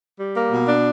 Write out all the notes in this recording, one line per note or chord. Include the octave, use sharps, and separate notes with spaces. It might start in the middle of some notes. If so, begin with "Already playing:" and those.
G3
A#3
B2
D4